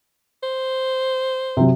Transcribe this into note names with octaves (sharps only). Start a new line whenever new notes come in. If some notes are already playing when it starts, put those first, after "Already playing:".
C5
C3 F#3